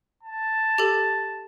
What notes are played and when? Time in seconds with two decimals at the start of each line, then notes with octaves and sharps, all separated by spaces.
0.23 A5
0.78 G4 A4